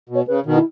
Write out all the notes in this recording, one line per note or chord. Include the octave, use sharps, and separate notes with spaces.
B2
C#5
C#3 B4
B2 D#3
E4